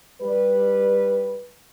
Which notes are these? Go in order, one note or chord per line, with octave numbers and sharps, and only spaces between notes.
G3 B4